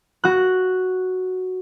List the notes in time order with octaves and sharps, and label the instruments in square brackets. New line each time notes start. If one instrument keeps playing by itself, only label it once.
[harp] F#4 F#6